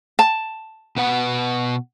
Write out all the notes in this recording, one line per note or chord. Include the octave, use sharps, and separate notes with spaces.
A5
B2 B4 F#5